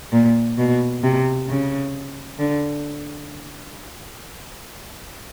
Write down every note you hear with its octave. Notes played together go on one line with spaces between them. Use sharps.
A#2
B2
C3
C#3
D3